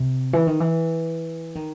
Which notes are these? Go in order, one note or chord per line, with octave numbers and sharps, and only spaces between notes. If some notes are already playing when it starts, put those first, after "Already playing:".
Already playing: C3
E3
D#3
E3
D#3